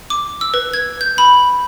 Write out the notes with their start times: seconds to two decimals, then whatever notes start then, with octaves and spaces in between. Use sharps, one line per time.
0.10 D6
0.41 E6
0.54 B4
0.74 G#6
1.01 G6
1.18 B5